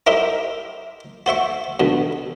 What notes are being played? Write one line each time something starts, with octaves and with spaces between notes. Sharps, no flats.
E4 G4 A#4 C5 D#5 E5
F#4 C5 E5 C#6
D2 B2